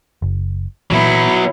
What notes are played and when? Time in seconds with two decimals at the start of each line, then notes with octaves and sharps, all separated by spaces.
0.22 F#1
0.91 A#2 E3 F#3 B3 E4